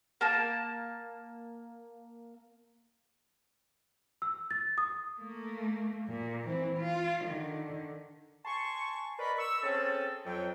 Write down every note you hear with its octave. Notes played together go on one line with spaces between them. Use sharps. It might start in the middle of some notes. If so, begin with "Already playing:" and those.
A#3 A5
E6
A6
D#6
A3 A#3
A#2
E3 C4
F4
D3 D#3
G#5 A5 C6 C#6
A#4 B4 D5 D#5 B5
C#6 E6
C4 C#4 G#4 A4
F2 F#3 G5